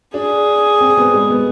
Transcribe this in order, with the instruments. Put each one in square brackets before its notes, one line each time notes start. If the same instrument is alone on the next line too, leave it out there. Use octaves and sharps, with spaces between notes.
[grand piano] D4 [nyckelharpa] G#4
[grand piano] C4
B3
G#3
B3